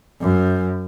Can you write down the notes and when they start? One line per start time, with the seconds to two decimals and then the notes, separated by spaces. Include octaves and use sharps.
0.21 F#2